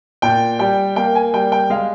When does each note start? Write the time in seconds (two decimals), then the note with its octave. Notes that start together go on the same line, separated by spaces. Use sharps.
0.22 A#2 G5
0.59 G3 G5
0.96 A#3 G5
1.15 G#5
1.34 G3 G5
1.52 G5
1.70 G#3 F5